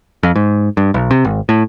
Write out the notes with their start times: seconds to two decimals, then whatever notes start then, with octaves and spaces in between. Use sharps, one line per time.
0.23 F2
0.36 G#2
0.77 G2
0.94 B1
1.11 C3
1.25 G#1
1.49 A2